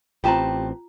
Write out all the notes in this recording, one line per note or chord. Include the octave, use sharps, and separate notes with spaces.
A1 C4 F4 G4 B4 A5 A#5